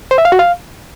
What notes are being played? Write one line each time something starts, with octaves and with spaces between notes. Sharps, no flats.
C5
E5
F5
F#4
F5